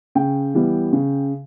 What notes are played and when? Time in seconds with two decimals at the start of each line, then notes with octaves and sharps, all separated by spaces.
0.15 C#3 G5
0.54 E3 G3 B3
0.93 C#3